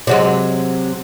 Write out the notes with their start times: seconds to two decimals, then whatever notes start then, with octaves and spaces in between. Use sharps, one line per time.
0.07 C3 F#3 G#3